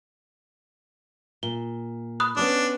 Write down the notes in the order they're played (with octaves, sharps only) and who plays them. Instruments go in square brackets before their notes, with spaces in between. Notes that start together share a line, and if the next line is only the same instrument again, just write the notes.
[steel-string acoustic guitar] A#2 [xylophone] G7
[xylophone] B5 D#6 F#6
[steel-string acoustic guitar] B3 C#4 C#5 [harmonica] D4